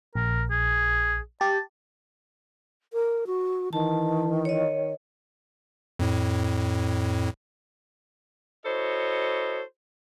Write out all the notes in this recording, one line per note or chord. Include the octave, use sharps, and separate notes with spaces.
A#1 A#4
G#4
G4 A5
A#4
F#4
D#3 E3 A5
C#5 D#5
F2 A2
E4 F#4 A4 C5 C#5 D#5